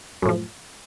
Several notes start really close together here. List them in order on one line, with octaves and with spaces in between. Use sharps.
F#2 A2 F3